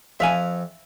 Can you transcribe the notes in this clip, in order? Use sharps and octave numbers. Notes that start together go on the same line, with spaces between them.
F2 E5 F5 G#5